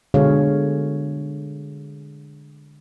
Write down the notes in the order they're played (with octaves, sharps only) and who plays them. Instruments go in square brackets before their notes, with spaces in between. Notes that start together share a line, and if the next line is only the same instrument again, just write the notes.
[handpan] B2 D3 G#3 G#4 C#5 F5